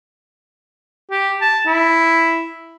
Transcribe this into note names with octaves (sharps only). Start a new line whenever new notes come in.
G4
A5
E4